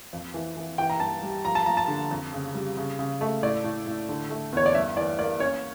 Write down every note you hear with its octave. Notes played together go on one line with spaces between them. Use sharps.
F2
E3
E3
E3 G5
A#5
G2 A5
G3
F3 A#5
A5
F3 A#5
A5
D3
F2
C#3
G3
C#3
C#3
A3
A2 D5
A2
A2
D3
A3
E2 C#5
D5
G2 E5
E3 D5
A#3 D5
C#4 C#5